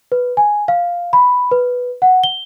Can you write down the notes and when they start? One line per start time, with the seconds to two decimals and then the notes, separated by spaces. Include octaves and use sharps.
0.12 B4
0.37 G#5
0.68 F5
1.13 B5
1.51 B4
2.02 F#5
2.24 G7